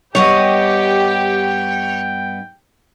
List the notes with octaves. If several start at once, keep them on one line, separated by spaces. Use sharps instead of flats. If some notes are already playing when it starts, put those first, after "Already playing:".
G2 B3 G4 C#5 D#5 G5